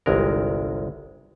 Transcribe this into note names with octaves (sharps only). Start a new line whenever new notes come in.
G1 C2 G#3 A#4